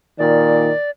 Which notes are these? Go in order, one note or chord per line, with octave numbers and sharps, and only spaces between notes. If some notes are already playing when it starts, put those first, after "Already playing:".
A#2 D#3 D5